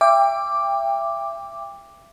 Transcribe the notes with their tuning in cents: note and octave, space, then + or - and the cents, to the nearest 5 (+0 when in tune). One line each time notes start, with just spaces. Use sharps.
E5 +30 G5 +25 D6 +0